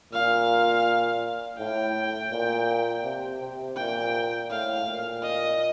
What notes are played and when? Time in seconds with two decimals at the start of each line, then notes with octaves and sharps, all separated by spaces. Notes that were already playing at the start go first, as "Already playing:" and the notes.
0.13 A#2 F5
1.59 A2 G5
2.32 A#2
3.04 C3
3.41 C3
3.77 A#2 G5
4.50 A2 F5
4.86 A#2
5.23 D#5